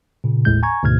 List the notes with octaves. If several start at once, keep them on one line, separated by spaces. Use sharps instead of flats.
A#2 C#3
G#1 D#2 A2 G#3 G6
G#5 A#5 C#6 G#6
D2 G#2 B2 F6 G#6